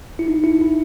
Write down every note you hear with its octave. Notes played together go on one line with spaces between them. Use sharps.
E4
D#4
E4
E4